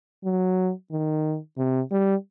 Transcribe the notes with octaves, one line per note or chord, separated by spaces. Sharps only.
F#3
D#3
C3
G3